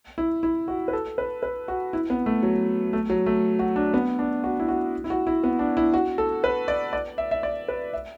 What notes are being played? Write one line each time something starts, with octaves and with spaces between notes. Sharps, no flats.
E4
E4
F#4
B4
A4
B4
B4
F#4
E4
B3
A3
F#3
A3
F#3
A3
F#4
D4
B3
D4
F#4
E4
F#4
E4
F#4
E4
B3
D4
E4
F#4
A4
B4
D5
D5
E5
E5
D5
B4
E5